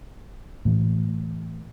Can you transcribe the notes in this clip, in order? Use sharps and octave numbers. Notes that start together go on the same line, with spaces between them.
A2 E3